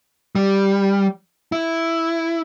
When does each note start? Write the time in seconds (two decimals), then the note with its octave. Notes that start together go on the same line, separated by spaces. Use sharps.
0.35 G3
1.52 E4